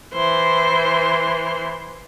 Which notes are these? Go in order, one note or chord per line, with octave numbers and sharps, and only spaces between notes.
E3 C5